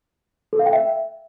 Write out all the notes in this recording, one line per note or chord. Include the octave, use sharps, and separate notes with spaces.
A4
F5
G5
E5